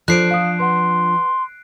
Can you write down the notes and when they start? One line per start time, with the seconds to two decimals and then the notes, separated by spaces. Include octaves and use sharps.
0.08 F3 D4 F4 A4 C5 F#6 C7 D7
0.31 F5 D#6
0.60 B4 F#5 C6